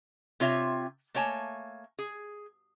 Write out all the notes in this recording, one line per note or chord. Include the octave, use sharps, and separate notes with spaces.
C3 C4 F4 C#5 E5
A3 A#3 C#5 G#5 A5
G#4